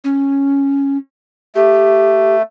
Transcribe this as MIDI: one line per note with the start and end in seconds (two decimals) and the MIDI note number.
0.04 0.97 61
1.55 2.42 57
1.55 2.35 67